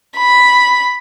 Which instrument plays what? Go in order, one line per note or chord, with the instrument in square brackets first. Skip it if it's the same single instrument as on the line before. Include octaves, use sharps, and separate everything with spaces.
[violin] B5